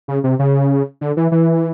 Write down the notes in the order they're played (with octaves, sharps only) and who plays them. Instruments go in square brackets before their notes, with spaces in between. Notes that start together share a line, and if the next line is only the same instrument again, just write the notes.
[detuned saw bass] C#3
C3
C#3
D3
E3
E3